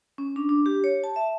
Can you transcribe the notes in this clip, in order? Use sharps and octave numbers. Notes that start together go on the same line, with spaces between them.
C#4
D4
D4
G4
C#5
A5
E5